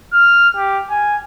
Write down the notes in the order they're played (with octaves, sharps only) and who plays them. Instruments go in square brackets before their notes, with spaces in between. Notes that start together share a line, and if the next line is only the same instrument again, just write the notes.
[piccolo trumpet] F6
G4
G#5